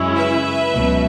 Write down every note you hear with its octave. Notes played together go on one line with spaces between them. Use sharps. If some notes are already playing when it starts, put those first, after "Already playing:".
Already playing: F#2 C#3 G#3 C#4 E4
B4 E5
C#2 B2 F#3